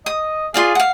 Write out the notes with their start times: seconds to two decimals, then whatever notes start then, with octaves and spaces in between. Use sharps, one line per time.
0.06 D#5 D#6
0.54 F4 G#4 D5 F5
0.75 F5 F#5